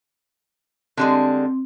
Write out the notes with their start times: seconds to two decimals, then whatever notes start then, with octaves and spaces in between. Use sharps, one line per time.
0.97 D3 G3 G#3 C4